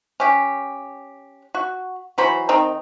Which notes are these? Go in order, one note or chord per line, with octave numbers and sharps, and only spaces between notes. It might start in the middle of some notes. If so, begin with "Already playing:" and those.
C#4 G4
F#4
E3 F#3 C5 B5
D#3 C4 D#4